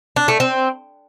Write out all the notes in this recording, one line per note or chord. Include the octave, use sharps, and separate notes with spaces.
D4
A3
C4